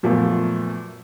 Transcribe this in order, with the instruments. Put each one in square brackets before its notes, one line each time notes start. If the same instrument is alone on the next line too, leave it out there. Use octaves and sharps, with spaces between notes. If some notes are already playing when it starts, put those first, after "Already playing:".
[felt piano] F#2 A#2 F3 A3 B3